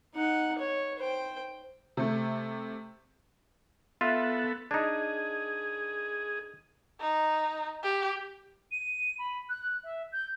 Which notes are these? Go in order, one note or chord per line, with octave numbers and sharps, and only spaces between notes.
D#4 F#5
C#5
C5 G5
C3 A3
B3 F4 A4 E5
D4 D#4 G#4
D#4
G4
D#7
B5
F#6
E5
G6